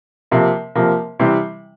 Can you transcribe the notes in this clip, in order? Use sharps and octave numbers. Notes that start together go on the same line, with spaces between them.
C3 F3 A#3
C3 F3 A#3
C3 E3 G3